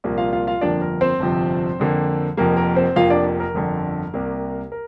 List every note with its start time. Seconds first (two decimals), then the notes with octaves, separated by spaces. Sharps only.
0.04 C2 A#2 F3 A#3
0.18 F4 F5
0.33 F4 F5
0.47 F4 F5
0.61 G1 F2 F3 A#3 D4 D5
0.81 A#4
1.01 C4 C5
1.20 G1 F2 C3 F3
1.80 F2 D3 A#3
2.37 F1 F2 F3 A#3 A#4
2.57 A#4
2.76 C4 C5
2.96 F1 F2 F3 A#3 F4 F5
3.10 D4 D5
3.40 A#4
3.54 G1 F2 D3
4.14 C2 C3 A#3
4.72 A#4